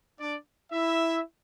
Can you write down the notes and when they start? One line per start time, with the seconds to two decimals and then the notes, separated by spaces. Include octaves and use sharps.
0.20 D4 D5
0.73 E4 E5